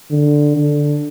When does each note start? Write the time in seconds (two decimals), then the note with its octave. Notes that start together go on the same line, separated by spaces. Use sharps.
0.11 D3
0.57 D3